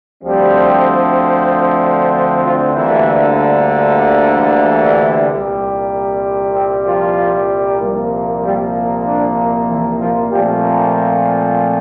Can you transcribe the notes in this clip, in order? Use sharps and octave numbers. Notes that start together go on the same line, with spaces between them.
D2 D3 F3 G3 C4 G4
F3 F4
D2 D3 E3 G3 A#3 E4
E3 E4
E3 E4
C2 A#2 G3
C4
F3 F4
C2 A#2 F3 A#3
G3 G4
D4
E3 E4
F3 F4
A#2 F3 G3 A3 C4 G4
A#3 A#4